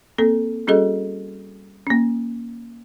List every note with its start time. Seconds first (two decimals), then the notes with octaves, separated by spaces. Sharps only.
0.18 A#3 C4 A4
0.67 G3 C#4 F#4 G#4 A4 D#5
1.87 A#3 C#4